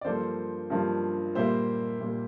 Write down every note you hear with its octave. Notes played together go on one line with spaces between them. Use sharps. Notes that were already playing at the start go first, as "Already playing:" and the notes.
D5
G2 F3 A#3 A4 C5
G2 F3 A#3
A#2 G3 A#3 C5 E5
A#2 G3 A#3